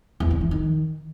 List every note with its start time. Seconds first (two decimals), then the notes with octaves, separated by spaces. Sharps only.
0.20 E2
0.31 C#3
0.41 E3
0.51 D#3